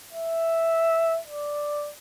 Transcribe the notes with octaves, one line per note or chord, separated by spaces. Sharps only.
E5
D5